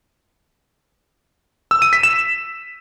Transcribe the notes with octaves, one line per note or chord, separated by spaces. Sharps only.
E6
D#7
B6
E7